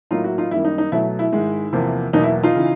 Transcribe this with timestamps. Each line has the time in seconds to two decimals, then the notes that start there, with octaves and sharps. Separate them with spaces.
0.11 A2 F#3 A#3 D#4 F4
0.24 E4 F#4
0.38 D#4 F4
0.51 F#2 D#3 G3 A#3 E4
0.65 D#4
0.78 D#4
0.92 B2 F#3 A3 E4
1.19 E4
1.33 G#2 D#3 G#3
1.73 E2 C3 F3 A#3
2.13 E2 B2 F#3 A#3 D#4
2.23 E4
2.43 D#4 F4
2.55 C#3 E3